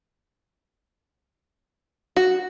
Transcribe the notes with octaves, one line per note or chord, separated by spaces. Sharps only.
F#4